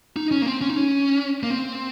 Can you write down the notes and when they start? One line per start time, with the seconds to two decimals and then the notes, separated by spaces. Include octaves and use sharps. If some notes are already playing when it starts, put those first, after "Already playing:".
0.16 D#4
0.31 C#4
0.42 A#3
0.46 C4
0.61 C#4
0.69 D#4
0.76 C#4
1.43 A#3
1.50 C4